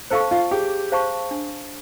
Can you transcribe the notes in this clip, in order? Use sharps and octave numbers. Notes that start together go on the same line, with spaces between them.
A4 C5 F5 A5 C#6
F4
G4 G#4
C5 F5 A5 C#6
D4